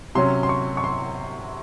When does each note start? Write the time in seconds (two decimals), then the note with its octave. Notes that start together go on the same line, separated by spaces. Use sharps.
0.15 C3 F#3 C#4 C6
0.43 C6
0.49 C#6
0.77 C#6
0.84 C6